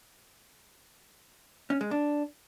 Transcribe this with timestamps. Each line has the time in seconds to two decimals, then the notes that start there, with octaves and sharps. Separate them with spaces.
1.70 C#4
1.81 G#3
1.91 D4